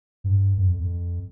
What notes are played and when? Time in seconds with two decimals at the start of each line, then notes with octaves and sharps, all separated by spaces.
0.24 G2
0.57 F#2
0.69 F2
0.80 F2